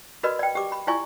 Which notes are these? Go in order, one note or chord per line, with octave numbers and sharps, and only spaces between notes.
F#4 A#4 B4 D5 D#5 B5
D5 G5
G4 D6
B5
E4 F4 D5 G#5 C#6